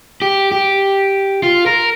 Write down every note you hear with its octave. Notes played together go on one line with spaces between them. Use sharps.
G4
G4
F4
A#4